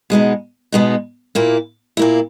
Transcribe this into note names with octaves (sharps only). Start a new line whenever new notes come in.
B2 G#3 B3 D#4
B2 G#3 B3 D#4
A#2 A#3 E4
A#2 A#3 E4